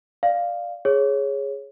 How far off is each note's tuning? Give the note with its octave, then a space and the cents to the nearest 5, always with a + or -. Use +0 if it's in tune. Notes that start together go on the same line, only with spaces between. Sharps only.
D5 +10 F5 +0
G#4 +0 C#5 -5